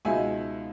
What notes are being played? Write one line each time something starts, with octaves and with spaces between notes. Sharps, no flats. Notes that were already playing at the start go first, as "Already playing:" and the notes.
C#2 B2 G#3 D#4 E5 G#5